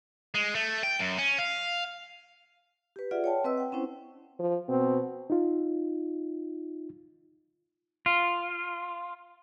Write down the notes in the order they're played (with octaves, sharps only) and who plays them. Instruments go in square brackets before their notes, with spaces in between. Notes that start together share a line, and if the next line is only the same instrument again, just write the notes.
[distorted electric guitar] G#3
A3
G5
F#2
C#4
F5
[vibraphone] G4 B4
F4 G#4 D5 E5 F#5
C#5 G5 A5
C4 B4 D#5 E6
F#5 G5
C4 C#4 E4 C5
[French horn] F3
[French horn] B2 [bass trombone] C4
[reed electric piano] D#4 F4
[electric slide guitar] F4